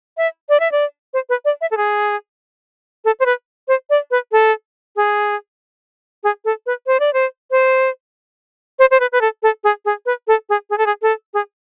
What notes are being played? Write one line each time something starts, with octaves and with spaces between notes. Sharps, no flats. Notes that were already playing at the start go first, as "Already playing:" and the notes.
E5
D5
E5
D5
C5
B4
D5
E5
A4
G#4
A4
C5
B4
C5
D5
B4
A4
G#4
G#4
A4
B4
C5
D5
C5
C5
C5
C5
B4
B4
A4
A4
G#4
G#4
B4
A4
G#4
G#4
A4
G#4
A4
G#4